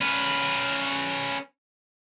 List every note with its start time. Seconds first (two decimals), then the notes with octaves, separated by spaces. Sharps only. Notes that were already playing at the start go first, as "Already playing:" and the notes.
0.01 C#4 B4